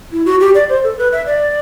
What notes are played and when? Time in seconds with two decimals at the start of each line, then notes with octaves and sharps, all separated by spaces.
0.12 E4
0.26 F#4
0.40 G4
0.55 D5
0.69 C5
0.84 A4
0.98 B4
1.12 E5
1.26 D5